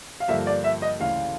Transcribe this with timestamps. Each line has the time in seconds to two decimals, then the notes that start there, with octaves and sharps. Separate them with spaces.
0.20 F5
0.28 G2 D3 F3 A#3 E5
0.47 D5
0.64 E5
0.82 D#5
1.00 D2 C#3 E3 F5